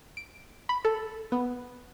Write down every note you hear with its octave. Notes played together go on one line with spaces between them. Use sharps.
D7
B5
A4
B3